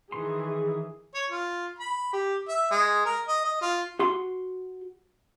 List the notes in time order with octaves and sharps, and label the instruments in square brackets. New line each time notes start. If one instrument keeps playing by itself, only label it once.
[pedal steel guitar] D#3 C6 [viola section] E3 G#4
[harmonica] C#5
F4
B5
G4
E5
G#3
A#4
D#5
D#5
F4
[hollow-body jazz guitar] F#4 C6